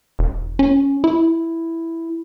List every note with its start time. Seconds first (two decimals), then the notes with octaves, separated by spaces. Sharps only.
0.19 E1
0.59 C#4
1.04 E4